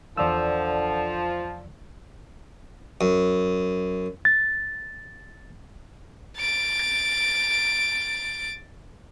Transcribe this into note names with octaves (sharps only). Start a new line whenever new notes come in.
E2 D3 F3 D5 E6
F#2
A6
A6 D7